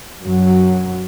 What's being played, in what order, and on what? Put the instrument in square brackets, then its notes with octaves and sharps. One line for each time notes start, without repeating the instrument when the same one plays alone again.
[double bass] F#2 F#3